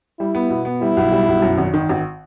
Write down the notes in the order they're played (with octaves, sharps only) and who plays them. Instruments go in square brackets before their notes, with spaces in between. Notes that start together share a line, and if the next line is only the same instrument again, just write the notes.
[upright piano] G3 [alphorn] E4
[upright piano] B3
B2
B3
[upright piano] G3 [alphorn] E4
[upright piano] B1
G3
B1
F#2
G#1
D#3
G#1